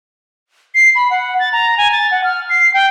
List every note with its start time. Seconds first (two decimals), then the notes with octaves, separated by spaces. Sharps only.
0.75 C7
0.95 B5
1.11 F#5
1.40 A6
1.53 A#5
1.78 G#5
1.92 A6
2.11 F#5
2.24 F6
2.50 C7
2.74 G5